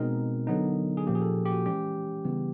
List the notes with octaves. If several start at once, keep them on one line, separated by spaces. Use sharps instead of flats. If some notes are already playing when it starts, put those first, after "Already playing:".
Already playing: B2 G#3 C4 D#4 A#4
D3 F#3 B3 D#4
G#4
A#2 F3 A#3 C#4 G4
G#4
A4
G4
F#4
E3 G#3 C#4 G4
C#3 E3 G3 B3